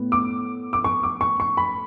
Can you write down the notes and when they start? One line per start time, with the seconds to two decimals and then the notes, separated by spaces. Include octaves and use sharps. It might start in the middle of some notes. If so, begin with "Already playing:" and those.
Already playing: A2 B3
0.12 D6
0.73 D6
0.84 C#6
1.03 D6
1.21 C#6
1.40 C#6
1.57 B5